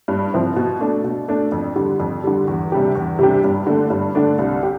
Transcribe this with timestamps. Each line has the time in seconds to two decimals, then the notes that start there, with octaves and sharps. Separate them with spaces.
0.08 G2
0.33 F3 C4 E4
0.56 B2
0.81 A3 D4
1.04 B2
1.28 A3 D4
1.52 F2
1.76 D3 G3
2.00 F2
2.24 D3 G3
2.48 E2
2.72 C3 G3 D4 G4
2.95 E2
3.19 C3 G3 D4 G4
3.44 G2
3.67 D3 A3 D4
3.90 G2
4.15 D3 A3 D4
4.38 C2
4.63 G4